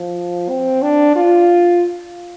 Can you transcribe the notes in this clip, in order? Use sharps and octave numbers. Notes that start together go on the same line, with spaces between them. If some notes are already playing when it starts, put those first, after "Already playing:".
Already playing: F3
C4
D4
F4